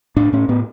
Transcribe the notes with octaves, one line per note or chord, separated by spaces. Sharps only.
A2 D4
A2 C#4
A2 B3